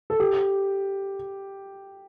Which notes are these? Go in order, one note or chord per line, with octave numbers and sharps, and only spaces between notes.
A4
G4